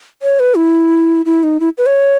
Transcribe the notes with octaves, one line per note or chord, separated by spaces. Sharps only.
C#5
B4
E4
E4
D#4
E4
B4
C#5